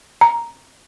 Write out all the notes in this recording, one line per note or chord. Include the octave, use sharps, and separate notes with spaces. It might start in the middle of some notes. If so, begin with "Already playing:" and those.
A#5